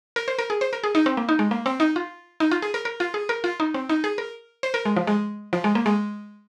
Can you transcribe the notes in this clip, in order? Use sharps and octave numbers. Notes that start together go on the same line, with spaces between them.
A#4
C5
A#4
G#4
C5
A#4
G#4
D#4
C4
A#3
D#4
G#3
A#3
C4
D#4
F4
D#4
F4
G#4
A#4
A#4
F4
G#4
A#4
F4
D#4
C4
D#4
G#4
A#4
C5
A#4
G#3
F3
G#3
F3
G#3
A#3
G#3